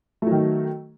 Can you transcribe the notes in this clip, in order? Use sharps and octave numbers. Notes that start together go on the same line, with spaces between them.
D#3 F#3 A3